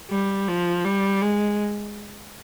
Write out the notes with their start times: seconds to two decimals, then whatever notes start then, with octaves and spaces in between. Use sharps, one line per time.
0.10 G3
0.48 F3
0.85 G3
1.22 G#3